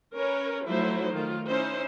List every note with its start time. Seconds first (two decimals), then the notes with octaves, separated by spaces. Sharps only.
0.15 C#4 A#4 B4 C#5
0.66 F3 F#3 A3 D#4 E4 C5
1.14 D#3 A3 F4
1.46 C#4 D#4 E4 C5